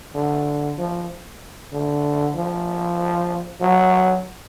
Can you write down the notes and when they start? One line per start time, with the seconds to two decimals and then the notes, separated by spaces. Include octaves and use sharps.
0.15 D3
0.78 F3
1.73 D3
2.35 F3
3.61 F#3